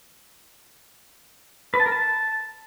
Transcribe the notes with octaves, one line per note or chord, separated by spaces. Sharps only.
B4
A5
A#4
A5